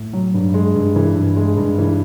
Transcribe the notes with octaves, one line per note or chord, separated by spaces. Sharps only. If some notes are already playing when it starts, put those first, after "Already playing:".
Already playing: A2
F#3
G2
G#3
G2
E3
G2
G#3
G2
E3